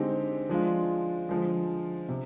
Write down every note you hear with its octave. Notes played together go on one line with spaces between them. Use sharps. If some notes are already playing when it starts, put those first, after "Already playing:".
Already playing: D3 G#3 C4 D#4 G4
F3 G#3 D4 F4
D3 F3 G#3
C3